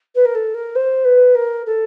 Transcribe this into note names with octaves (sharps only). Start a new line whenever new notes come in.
B4
A#4
A4
A#4
C5
B4
A#4
A4